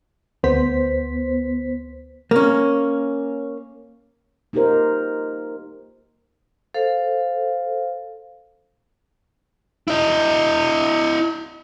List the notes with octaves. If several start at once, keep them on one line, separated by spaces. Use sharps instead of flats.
D2 B3 C5 B6
A#3 C#4
A#3 D#4 F4 G4 A#4 C5
A4 C5 F5
E4 D#5